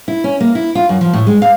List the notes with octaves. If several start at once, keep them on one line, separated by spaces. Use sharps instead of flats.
E4
C#4
A#3
E4
F4
F#2
F3
A2
G#3
F5